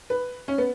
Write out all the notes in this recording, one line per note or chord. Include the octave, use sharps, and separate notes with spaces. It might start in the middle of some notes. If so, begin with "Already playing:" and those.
B4
C#4
B3